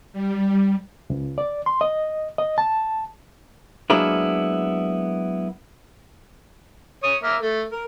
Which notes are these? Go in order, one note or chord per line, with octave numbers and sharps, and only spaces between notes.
G3
C#2
D5
C6
D#5
D#5
A5
F#3 G#3 A#3 B3 D4 E4
C#5 D#6
A#3 E5 F6
A3
A#4